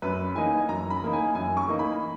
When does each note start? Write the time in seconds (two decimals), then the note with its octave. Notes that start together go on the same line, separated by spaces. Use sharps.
0.02 F#2 B4
0.35 E3 A#3 D#4 G#5
0.69 F#2 A#5
0.90 B5
1.02 E3 A#3 D#4
1.13 G#5
1.35 F#2 G#5
1.57 C#6
1.68 E3 A#3 D#4
1.79 B5